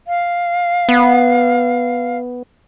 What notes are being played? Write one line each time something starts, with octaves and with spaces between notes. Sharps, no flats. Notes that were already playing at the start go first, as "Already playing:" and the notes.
F5
B3